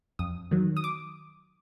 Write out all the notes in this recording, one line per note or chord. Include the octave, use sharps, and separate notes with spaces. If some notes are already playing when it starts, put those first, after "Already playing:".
F2 D#6
D#3 F#3
D#6
D6